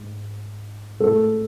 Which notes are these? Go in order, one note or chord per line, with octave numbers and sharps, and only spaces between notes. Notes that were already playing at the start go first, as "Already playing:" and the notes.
Already playing: G#2
A2 G#3 A4